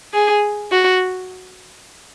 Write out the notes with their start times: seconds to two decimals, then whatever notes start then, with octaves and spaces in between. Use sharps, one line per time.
0.14 G#4
0.72 F#4